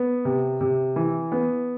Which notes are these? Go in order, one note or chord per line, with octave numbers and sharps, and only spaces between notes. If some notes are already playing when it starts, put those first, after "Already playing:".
Already playing: B3
C3
C3
E3
B3